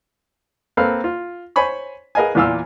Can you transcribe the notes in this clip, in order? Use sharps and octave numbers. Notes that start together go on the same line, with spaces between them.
A#3 C4 A4 B4 F5
F4
C5 C#5 G#5 B5 C#6
G#4 A#4 B4 D#5 F5 G#5
E2 A#2 E3 F4 F5 E6